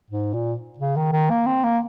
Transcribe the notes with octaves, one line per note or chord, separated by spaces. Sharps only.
G#2
A#2
C#3
D#3
D#3
A#3
C4
A#3